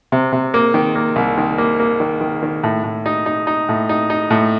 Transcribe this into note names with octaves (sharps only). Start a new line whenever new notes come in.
C3
C3
A#3
D#3
A#3
C2
D#3
A#3
A#3
D#3
D#3
D#3
A2
A2
D#4
D#4
D#4
A2
D#4
D#4
A2